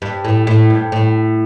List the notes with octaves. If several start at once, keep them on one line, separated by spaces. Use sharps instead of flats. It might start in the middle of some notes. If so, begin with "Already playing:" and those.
G2
A2
A2
G2
A2